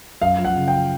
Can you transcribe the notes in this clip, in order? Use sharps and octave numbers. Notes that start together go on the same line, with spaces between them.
F#2 F5
F3
F#5
C#3
G5